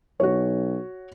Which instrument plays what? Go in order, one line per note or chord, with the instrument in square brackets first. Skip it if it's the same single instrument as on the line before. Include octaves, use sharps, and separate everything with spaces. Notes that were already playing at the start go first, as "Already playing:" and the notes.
[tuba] B1 [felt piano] F#4 C#5